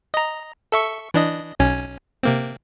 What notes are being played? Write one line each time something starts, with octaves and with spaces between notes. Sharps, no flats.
D#5 A#5
A4 E5 C#6
E3 D4 D#5
B1 C#4 G#5
C3 A#3 C4